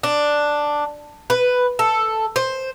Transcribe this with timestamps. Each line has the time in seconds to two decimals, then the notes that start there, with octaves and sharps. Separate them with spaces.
0.03 D4
1.30 B4
1.79 A4
2.36 C5